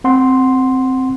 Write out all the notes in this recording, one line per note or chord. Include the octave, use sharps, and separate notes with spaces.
C4 F#5 C6